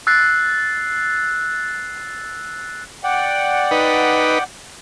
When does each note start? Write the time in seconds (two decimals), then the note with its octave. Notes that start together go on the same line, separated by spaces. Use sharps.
0.07 E6 F#6 A6 C7
3.04 D5 F#5 G5
3.71 D#4 B4